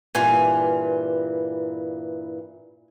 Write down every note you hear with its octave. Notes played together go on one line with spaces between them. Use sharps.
G2 A#2 E3 G#5